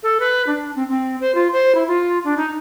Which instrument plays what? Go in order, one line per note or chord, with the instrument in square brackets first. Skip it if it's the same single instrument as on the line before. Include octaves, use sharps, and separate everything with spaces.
[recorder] A4
B4
D4
C4
C4
C5
F4
C5
E4
F4
D4
D#4